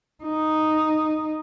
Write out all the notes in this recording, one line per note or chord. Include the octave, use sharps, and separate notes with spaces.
D#4